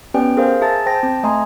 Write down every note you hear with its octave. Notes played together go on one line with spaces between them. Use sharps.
B3 C#4 G4 B4 D5 G5
G#4 A#4 C5 F5
G#4 E5 A5 A#5 A6
C5 G5 A5 A#6
C4
A3 D#5 G#5 A#5 C6 D#6